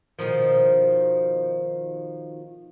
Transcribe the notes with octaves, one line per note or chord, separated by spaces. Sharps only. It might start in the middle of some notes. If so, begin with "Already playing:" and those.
B2 D#3 F3